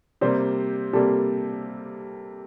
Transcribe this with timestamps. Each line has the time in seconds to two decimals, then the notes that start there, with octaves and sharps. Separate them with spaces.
0.21 C3 G3 A#3 C5
0.93 C3 G3 A#3 A4